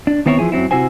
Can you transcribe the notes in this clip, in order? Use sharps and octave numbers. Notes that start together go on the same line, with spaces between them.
D4
D#3 B3 C4 E4 A#4 C#5
E3 F3 E4 G#4
F#2 F#3 C4 E4
C3 E4 F#4 C5 G#5